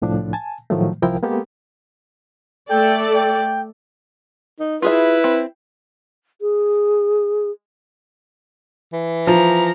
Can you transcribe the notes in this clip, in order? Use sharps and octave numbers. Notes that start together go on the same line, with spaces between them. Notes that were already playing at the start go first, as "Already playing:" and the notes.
C2 A2 F3 D4
G#5 A5
A2 D#3 F3 F#3 A3
C2 F3 E4 A#4 G5
G#3 A#3 B3 G4 A4
A3 A4 D5 G5
G5
D#4
E4 F4 G#4 B4 E5
C4
G#4
E3
F3 A#5